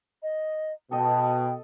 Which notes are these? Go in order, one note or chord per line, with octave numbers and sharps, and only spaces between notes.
D#5
B2 A4 D#5 G5